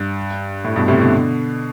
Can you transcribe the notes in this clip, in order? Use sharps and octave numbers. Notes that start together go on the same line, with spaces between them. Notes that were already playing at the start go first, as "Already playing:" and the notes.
Already playing: G2
A2
G2 B2
A2 C3
B2 D3